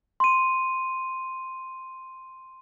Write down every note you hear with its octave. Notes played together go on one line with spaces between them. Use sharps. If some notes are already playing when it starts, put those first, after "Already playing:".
C6 D#7